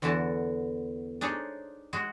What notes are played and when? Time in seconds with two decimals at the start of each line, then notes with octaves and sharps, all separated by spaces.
0.02 E2 D3 E3 F#4 A5
1.21 D4 D#4 G#4 C5 C#5
1.93 G#3 F#4 G#4